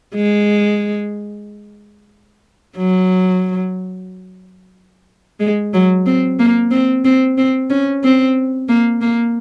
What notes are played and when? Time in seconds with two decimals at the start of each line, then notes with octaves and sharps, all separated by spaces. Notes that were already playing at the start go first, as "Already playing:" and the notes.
0.15 G#3
2.77 F#3
5.40 G#3
5.73 F#3
6.06 C4
6.39 A#3
6.71 C4
7.05 C4
7.38 C4
7.70 C#4
8.03 C4
8.69 A#3
9.01 A#3